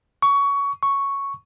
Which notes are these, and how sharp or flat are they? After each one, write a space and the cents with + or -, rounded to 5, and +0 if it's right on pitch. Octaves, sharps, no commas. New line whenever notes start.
C#6 +20
C#6 +0